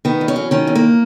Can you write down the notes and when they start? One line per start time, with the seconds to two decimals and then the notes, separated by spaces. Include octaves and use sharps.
0.05 D#3 B3
0.21 E2
0.28 C#4
0.36 F#3
0.51 D#3 C#4
0.67 E2
0.75 A#3